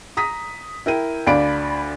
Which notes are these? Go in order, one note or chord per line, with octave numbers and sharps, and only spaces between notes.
A#5 D#6 B6
E4 A#4 G5 D#7
D2 D4 D5 F5 B5 D7